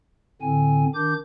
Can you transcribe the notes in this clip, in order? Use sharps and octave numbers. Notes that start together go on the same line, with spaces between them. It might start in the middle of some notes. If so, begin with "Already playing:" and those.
A2 D3 C4 G#5
D#3 D4 D6 G6